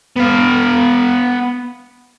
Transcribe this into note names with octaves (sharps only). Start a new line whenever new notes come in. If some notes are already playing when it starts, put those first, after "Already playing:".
B3 F5